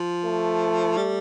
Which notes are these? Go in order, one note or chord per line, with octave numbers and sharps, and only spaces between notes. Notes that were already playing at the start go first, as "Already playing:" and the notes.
Already playing: F3
A3
G3